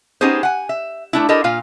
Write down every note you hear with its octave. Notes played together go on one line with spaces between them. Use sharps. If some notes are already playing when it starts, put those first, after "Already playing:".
B3 C#4 D#4 G4 G#4 C5
F#5 G#5
E5
A3 D4 E4
E4 G4 A4 A#4 D#5
A#2 F4 F5